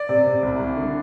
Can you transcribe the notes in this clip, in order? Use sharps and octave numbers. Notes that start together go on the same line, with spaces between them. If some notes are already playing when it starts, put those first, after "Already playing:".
Already playing: D5
C3
C3
C2
C2
D3